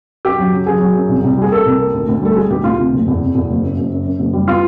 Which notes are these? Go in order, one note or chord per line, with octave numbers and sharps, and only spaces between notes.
F#2 G4
F#3
C#3
F#3 G#4
F#3
F#2
C2
C2
G3 G#4
A#3 A4
C2
A#3
D2
D2
G3 A4
G3 G#4
D2 G4
D2 F4
C3
F#1
E2
C3
E2
F#1
F#2
F#1
F#2
F#2
F#1
G3
B3 F4